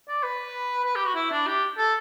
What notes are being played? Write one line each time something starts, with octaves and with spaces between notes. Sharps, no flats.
D5
B4
B4
G4
F#4
E4
D4
G4
A4